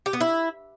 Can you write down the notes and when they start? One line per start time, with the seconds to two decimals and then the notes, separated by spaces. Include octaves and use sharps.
0.06 G4
0.13 B3
0.21 E4